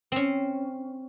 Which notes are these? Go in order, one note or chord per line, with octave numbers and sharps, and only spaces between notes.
C4 C#4